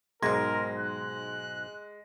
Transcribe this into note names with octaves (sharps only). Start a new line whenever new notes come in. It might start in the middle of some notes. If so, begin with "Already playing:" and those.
B1 G#2 G#3 A#4 C6 G#6 A#6
F#6